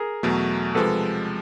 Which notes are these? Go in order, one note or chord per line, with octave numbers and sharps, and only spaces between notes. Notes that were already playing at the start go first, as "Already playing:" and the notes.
Already playing: G#4 A#4
E2 B2 F#3 A3
C3 F3 G#3 A4 B4